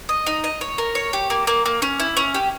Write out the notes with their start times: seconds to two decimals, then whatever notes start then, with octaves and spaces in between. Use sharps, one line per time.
0.09 D#5
0.27 D#4
0.44 D#5
0.61 C#5
0.78 A#4
0.95 C#5
1.13 G4
1.30 A#3
1.47 A#3
1.66 A#3
1.82 C#4
2.00 E4
2.17 C#4
2.34 G4